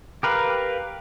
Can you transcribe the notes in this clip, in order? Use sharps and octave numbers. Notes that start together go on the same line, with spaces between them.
G4 A#4 B4 F5